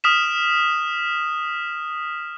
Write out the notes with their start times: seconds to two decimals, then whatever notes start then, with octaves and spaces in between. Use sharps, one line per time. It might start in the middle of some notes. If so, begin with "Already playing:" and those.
0.04 D#6 F6 B6 E7